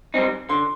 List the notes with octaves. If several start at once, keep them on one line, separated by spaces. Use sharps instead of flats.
G3 C4 D#4
D3 C6